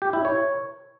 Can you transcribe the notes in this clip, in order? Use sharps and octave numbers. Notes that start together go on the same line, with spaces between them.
G4
E4
C#5